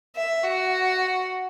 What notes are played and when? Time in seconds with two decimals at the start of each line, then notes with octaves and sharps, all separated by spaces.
0.16 E5
0.44 F#4